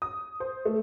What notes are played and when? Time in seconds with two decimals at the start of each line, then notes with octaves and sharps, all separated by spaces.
0.02 D#6
0.40 C5
0.65 A3